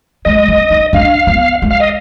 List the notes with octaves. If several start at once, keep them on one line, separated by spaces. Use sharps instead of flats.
G#3 D#5
C4
D#4
D4 F5
B3
G#3
F5
D#5